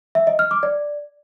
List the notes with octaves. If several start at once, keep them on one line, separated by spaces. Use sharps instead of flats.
E5
D#5
F6
D6
D5